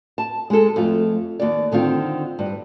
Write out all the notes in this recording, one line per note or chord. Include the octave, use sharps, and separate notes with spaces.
A5
G#3 A4
F2 A3 F4
D#2 D5
D3 D#3 C4 F4
G2